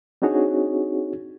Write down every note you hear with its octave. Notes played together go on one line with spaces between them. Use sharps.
C4 D4 D#4 F#4 G#4 C#5